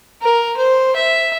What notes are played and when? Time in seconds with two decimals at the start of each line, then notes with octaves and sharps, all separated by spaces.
0.22 A#4
0.57 C5
0.96 E5